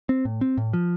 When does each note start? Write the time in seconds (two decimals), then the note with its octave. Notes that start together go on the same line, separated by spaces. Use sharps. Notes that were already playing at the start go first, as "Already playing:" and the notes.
0.09 C4
0.25 A2
0.41 C4
0.57 A2
0.73 F3